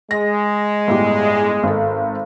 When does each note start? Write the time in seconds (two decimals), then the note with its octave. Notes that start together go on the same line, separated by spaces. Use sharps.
0.11 G#3 A#6
0.87 G1 A2 G4
1.63 G#1 A4